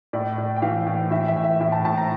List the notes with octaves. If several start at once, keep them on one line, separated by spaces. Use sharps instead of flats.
A2 D5
A2
G5
E3 F5
A2
E3 E5
E5
A2
E5
A2 E5
A5
A2 A5
A#5